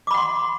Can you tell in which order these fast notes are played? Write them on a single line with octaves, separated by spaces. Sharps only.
D6 B5 F#5 C6